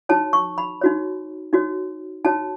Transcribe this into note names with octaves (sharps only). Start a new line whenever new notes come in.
D#4 F#4 C#5 A5
C#6
B5
D#4 F#4 C#5
D#4 F#4 C#5
D#4 F#4 C#5 A5